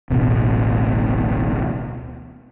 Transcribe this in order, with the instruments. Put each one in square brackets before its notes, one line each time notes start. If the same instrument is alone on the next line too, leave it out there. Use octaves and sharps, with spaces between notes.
[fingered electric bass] D1 A1 B2